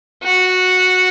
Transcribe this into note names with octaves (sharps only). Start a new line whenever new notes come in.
F#4